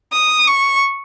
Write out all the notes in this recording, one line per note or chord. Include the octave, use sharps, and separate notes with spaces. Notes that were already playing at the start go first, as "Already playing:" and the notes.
D#6
C#6